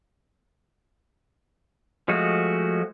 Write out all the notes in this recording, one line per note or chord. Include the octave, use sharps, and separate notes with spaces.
F3 G#3 A3 F#4